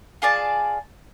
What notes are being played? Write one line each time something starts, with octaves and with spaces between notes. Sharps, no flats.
F4 G#4 D5 A5